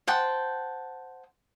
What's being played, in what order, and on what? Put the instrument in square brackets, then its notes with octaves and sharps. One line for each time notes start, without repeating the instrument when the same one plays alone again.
[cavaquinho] C5 F#5 G5 A5